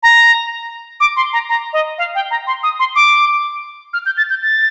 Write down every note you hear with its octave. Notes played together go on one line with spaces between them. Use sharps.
A#5
D6
C6
A#5
A#5
D#5
F5
G5
A#5
C6
D#6
C6
D6
F6
G6
A6
G6
A6